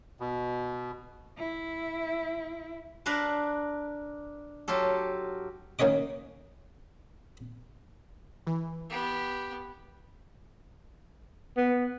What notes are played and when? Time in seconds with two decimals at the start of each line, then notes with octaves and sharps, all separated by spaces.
0.20 B2
1.38 E4
3.06 D4 A#4 B4 F5 A5
4.68 F#3 F4 G4 A4
5.79 D#3 A#3 C#4 C#5 D#5 D6
8.47 E3
8.90 B3 G4
11.57 B3